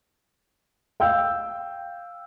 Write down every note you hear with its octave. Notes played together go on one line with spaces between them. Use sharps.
F5 G5 E6 G6